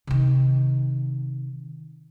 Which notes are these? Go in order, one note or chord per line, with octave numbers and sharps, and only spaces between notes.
C3 D#3